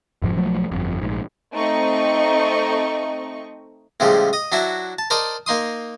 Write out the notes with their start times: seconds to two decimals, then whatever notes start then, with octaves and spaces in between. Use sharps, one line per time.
0.22 F1 G#2 F3
0.36 B1 F3 F#3 A3
0.71 G1 F2
1.02 A#1 G#2
1.55 A3 C4 D#4 D#5 C#6
4.00 A2 C#3 F3 G3 G#3
4.33 D#5 D#6
4.52 F#3 D4 E4 F#4 E5
4.99 A5
5.10 A#4 C5 D5 D#5 A5
5.46 A#3 D#4 C6 D#6